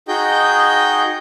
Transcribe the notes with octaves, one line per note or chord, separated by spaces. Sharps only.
D#4 F#4 G#4 D#5 G5 G6